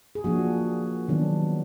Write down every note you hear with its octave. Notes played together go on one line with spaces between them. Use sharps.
G#4
F3 A#3 D4 F#4
D#3 F#3 B3 D4